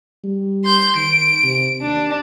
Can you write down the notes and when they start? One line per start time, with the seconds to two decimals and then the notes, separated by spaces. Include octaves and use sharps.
0.24 G3
0.64 C6 G6
0.96 D#3 D7
1.43 C3
1.82 D#2 D4